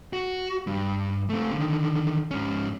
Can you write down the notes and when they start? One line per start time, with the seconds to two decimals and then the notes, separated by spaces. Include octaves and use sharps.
0.13 F#4
0.67 G2
1.29 A3 C4
1.52 D3 D#3
2.31 G#2 C#4